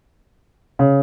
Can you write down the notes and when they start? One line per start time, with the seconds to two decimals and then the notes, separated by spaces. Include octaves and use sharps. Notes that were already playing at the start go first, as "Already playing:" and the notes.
0.79 C#3